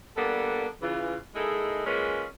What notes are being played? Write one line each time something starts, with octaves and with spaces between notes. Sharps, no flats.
G3 A#3 B3 D4 A4
C#3 E3 F4
G#3 A#3 D#4 E4 G#4 A4
G#3 A#3 C#4 F4 G#4 B4